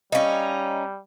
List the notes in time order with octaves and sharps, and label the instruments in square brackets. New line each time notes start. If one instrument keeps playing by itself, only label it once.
[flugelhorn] G3 [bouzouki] C#4 D#4 [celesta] D#5 F5